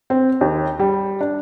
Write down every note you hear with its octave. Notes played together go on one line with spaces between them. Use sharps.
C4
D#2
G3
D4